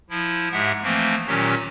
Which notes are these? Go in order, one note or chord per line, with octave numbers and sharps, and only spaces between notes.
F3 E4
G#2 G#3 G4 E5 F#5
E3 F3 A3 A#3 C4
A#2 D#3 F#3 C#4 G4